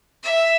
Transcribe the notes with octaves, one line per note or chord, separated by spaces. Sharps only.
E5